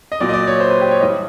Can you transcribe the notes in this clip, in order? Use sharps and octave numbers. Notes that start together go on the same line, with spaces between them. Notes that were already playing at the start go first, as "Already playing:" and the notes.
D#5
A#2 F#3 D5
D#5
D5
C#5
C5
B4
G4
C#5
G2 E3 G3 D#5